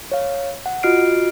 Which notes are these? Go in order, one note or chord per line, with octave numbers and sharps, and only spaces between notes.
C#5 F5
F#5
F4 F#4 D#5 F6 C7 D7